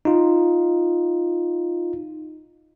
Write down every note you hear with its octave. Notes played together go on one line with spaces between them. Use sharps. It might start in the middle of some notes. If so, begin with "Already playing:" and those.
D#4 F4